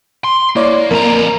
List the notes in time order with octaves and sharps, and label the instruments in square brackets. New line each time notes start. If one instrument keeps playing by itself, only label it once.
[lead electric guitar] C6
[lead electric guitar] A#3 [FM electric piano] E4 C#5 D5
[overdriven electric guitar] F2 A#5 [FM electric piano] A#4